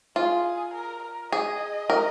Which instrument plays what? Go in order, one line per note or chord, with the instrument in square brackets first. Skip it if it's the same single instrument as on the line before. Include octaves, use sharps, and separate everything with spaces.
[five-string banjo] F4 [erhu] G#4
[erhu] A#4
A#4
[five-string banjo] G#4 [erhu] D#5
[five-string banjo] A#4